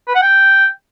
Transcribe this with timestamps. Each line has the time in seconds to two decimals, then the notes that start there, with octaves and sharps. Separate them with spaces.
0.08 B4
0.15 F#5
0.22 G5